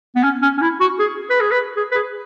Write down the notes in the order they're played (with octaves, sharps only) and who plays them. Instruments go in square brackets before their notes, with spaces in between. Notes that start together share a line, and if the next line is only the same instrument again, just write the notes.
[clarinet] B3
C#4
C#4
C#4
E4
F#4
G#4
B4
G#4
B4
G#4
B4
G#4